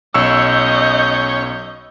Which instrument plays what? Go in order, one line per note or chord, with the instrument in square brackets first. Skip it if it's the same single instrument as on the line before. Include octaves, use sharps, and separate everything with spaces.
[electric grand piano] B1 C#6 E6 [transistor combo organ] C#4 C#5 [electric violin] D#5 G6